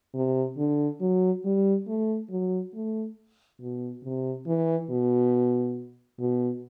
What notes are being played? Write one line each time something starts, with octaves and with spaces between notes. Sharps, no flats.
C3
D3
F#3
G3
A3
F#3
A3
B2
C3
E3
B2
B2